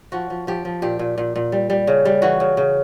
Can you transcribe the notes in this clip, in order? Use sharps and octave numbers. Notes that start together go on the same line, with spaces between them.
F3 F#4
F3
F3 G4
F3
A#2 G4
A#2
A#2
A#2
G3
G3
C#3
G3
E3 F#4
C#3
C#3